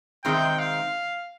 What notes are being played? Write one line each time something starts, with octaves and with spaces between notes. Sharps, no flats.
C3 D#3 G#3 C4 D#4 G5
F5